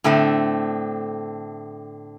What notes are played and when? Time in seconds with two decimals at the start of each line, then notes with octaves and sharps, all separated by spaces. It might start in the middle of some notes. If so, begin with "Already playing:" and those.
0.04 A2 D3 A3 C4